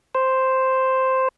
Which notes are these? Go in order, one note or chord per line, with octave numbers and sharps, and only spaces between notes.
C5